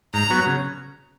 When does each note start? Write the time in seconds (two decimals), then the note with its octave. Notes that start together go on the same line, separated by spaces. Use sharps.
0.14 G#2 A#5
0.30 F#3 B3 F#4
0.46 C#3